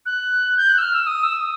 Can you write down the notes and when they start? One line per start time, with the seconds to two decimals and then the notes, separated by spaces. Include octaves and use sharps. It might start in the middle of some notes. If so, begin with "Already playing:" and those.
0.06 F#6
0.57 G6
0.69 F#6
0.78 E6
0.82 F6
0.94 E6
1.07 D#6
1.24 E6
1.40 D#6